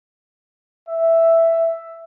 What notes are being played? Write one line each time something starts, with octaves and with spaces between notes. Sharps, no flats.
E5